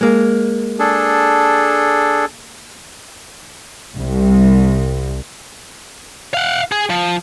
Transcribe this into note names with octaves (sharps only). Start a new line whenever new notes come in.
G#3 A#3
D4 G#4 A4
C2
F5 F#5
G#4
F3